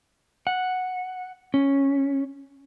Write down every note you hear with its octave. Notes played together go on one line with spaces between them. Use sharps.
F#5
C#4